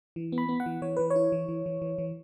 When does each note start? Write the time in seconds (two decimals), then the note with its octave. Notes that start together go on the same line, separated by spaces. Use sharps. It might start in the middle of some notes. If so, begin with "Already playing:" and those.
0.16 E3
0.32 B3
0.38 B5
0.49 B3
0.60 F#5
0.66 E3
0.82 E3 C#5
0.97 E3 B4
1.10 C#5
1.16 E4
1.32 E3
1.48 E3
1.66 E3
1.82 E3
1.98 E3